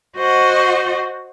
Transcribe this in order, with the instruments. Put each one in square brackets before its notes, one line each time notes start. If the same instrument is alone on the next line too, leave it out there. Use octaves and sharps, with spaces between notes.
[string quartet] F#4 C5 D#5 F#5